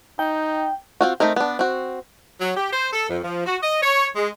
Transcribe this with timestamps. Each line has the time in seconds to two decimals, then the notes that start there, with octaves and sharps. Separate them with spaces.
0.19 D#4 G5
1.01 C4 F4 F#4
1.20 A3 C4 D#4 A#4
1.36 B3 D4
1.59 C4 F#4
2.41 F#3
2.57 G4
2.73 C5
2.93 A4
3.09 F2
3.24 F3
3.46 F#4
3.62 D#5
3.82 C#5
4.16 G#3